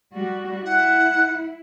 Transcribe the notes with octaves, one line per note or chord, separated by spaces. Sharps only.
G3 F#4
E4 F#5